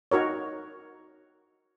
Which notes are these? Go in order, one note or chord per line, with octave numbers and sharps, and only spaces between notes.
D#4 F#4 A#4 C#5